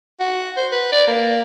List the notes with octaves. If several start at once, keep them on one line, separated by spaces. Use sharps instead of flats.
F#4
C5
B4
D5
A#3